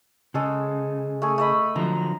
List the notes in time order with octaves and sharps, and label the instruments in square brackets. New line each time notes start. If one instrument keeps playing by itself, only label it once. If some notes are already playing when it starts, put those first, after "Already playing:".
[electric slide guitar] C#3 [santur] G#3 A4 D#6
[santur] A3 G#4
A3 D#5 B5
[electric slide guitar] D3 F3 F#3 [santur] A#5